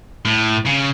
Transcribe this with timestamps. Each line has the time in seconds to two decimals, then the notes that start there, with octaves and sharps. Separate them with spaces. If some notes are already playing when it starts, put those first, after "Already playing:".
0.25 A2
0.66 C#3